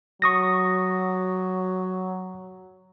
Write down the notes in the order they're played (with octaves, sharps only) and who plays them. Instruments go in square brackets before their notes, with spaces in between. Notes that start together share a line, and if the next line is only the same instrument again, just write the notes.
[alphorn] F#3 [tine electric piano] C#6 D#6 A#6